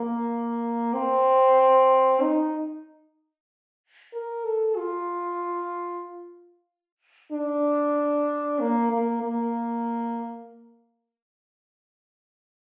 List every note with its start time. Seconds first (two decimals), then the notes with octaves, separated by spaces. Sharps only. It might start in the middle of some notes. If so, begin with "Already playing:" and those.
Already playing: A#3
0.94 C4
2.21 D#4
4.13 A#4
4.45 A4
4.76 F4
7.32 D4
8.60 A#3
8.92 A#3
9.22 A#3